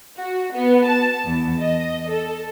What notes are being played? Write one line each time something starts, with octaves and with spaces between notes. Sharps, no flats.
F#4
B3
A5
E2
D#5
A4